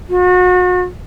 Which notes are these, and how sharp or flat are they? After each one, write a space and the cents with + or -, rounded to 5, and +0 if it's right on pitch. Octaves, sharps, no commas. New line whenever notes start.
F#4 -35